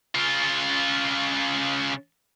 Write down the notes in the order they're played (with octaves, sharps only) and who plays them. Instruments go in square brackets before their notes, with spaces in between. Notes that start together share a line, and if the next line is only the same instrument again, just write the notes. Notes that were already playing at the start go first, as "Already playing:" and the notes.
[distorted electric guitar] C#3 F4